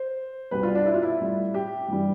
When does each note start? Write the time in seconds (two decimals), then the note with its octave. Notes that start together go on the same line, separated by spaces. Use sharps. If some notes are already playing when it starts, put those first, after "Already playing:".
Already playing: C5
0.51 C2 B2 G3 B4
0.63 F4
0.75 D4
0.86 E4
0.94 F4
1.03 E4
1.20 A2 G3
1.54 G4
1.88 G2 E3 G3